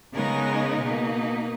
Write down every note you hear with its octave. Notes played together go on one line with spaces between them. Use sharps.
C#3 G#3 B3 D#4 A#4
B2 A#3 D#4